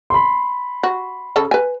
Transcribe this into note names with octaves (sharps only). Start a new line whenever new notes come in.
B5 C6
F#4
C#3 G#4 A4
B4 G#5